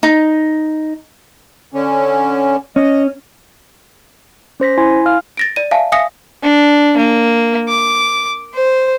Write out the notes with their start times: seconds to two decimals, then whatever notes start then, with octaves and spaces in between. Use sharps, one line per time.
0.03 D#4
1.74 D3 C#4
2.76 C#4 D#5
4.60 C#4 C5 A#6 B6
4.78 E4 G#5 C6
5.06 F5 F6
5.37 A6 A#6 D7
5.56 D5 D#7
5.71 E5 F5 G#5 A5
5.92 E5 F5 G#5 D#6 A#6 C#7
6.43 D4
6.97 A#3
7.68 D6
8.54 C5